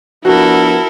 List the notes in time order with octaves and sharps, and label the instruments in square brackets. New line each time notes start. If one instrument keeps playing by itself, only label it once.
[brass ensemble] F3 B3 D4 [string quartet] E4 A4 A#4 [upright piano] F#4